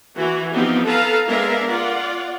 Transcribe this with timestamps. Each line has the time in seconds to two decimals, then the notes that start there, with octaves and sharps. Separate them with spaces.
0.15 E3 F#4
0.51 F3 B3 C4 D#4 G4
0.85 A4 B4 F5 A5 A#5
1.26 G#3 B3 D4 A#4 E5 F5
1.69 F4 D5 F#5